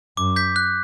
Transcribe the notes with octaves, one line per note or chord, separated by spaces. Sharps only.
F#2 D6
G6 B6
F#6